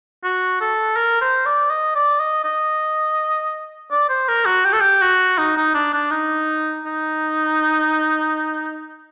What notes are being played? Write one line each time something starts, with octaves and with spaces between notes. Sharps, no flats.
F#4
A4
A#4
C5
D5
D#5
D5
D#5
D#5
D5
C5
A#4
F#4
G4
A4
G4
F#4
D#4
D#4
D4
D4
D#4
D#4